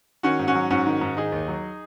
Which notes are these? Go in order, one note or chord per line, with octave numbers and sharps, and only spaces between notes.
D#3 C#4 F#4
G#2
C#4 F#4
F#3
G#2 C#4 F#4
D#3
G#2
D#3 D#4 G#4
D#2
F#3